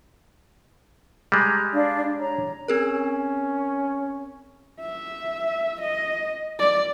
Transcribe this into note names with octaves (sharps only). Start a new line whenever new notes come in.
G3 G#3 A#5
D4 D5 F5
C#5 A#5
C4 C#4 G#4 A#4
E5
D#5
D5